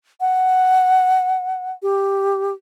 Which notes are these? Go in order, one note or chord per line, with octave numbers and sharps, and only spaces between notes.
F#5
G4